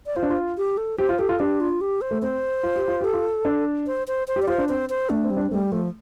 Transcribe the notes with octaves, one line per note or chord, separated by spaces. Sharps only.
D5
F4 C5
D4
F4
G4
A4
G4 C5
F4
G4 A4
F4
D4 G4
F4
G4
C5
A3
C4 C5
F4
G4
F4
G4 A4
F4
D4
C5
C5
C5
G4
D5
F4 C5
D4
C4 C5
C5
A3 D4
C4
G3
D4
C4
G3 A3
F3 A3